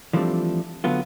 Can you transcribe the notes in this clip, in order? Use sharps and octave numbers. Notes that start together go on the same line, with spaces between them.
E3 F3 G3 A3 C4 D4
D3 F#3 A3 B3 F4